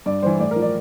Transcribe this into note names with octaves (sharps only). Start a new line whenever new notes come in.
G2 D5
E3 G3 C5
A2 D5
A#4
F3
D5